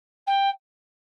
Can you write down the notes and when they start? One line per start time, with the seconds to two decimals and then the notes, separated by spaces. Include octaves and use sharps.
0.27 G5